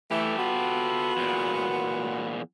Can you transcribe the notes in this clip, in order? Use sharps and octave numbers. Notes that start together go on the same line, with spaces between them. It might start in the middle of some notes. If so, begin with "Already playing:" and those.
E3 A3 G4 A4
B3 F4 F#4
E2 A#2